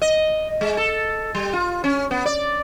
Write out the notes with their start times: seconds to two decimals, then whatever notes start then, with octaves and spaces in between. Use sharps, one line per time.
0.02 D#5
0.61 G#3
0.77 A4
1.35 G3
1.53 F4
1.84 C#4
2.11 B3
2.26 D5